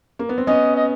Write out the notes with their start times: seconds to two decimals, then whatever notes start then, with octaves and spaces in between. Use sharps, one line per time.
0.19 A#3
0.29 B3
0.38 C4
0.47 B3 C#4 D#5
0.76 D#5